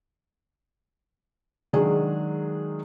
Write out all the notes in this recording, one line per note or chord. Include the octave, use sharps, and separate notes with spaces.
D#3 F#3 G#3 D4 G#4